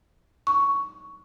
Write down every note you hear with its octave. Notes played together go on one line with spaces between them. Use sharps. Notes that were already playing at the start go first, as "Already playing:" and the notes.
C#6